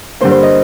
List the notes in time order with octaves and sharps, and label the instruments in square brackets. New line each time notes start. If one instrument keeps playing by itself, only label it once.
[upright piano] G2 D3 G3 A#3 [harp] C5
[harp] C5
D#5